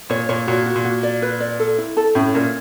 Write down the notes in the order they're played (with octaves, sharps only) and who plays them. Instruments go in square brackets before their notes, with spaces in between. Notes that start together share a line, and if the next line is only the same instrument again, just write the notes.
[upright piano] A#2 [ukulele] C#5
[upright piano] A#2 [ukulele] C#5
[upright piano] A#2 [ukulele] F#4
[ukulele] F#4
[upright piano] A#2
[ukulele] F#4
D5
B4
D5
A4
E4
A4
[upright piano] A2 [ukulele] C#4
[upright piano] A#2 [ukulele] A#4